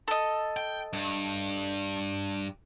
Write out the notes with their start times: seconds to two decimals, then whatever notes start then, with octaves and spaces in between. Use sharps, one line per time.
0.08 A4 D#5
0.57 G5
0.93 G2